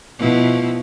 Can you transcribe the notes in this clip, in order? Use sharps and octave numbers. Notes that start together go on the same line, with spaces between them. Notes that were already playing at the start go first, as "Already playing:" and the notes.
B2 F3 E4